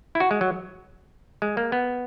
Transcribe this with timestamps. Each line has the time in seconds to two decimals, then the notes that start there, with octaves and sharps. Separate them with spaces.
0.15 E4
0.20 F#4
0.31 G#3
0.41 F#3
1.42 G#3
1.57 A#3
1.72 B3